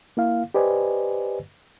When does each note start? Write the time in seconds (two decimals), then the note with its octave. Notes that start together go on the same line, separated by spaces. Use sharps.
0.17 A#3 E4 F5
0.54 G4 B4 C5 D5 D#5 G#5